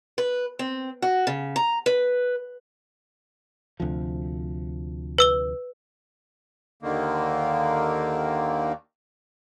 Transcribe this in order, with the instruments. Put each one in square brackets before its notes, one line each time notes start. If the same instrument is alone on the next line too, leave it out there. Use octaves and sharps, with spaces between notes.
[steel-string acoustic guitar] B4
C4
F#4
C#3
A#5
B4
[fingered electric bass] D2 C3 F3
[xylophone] B4 E6 G7
[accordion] D#2 D3 D#3 A#3